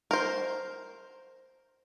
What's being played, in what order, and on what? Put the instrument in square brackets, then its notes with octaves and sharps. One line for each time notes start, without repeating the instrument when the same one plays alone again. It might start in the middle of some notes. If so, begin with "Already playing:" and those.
[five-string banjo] A#4 C5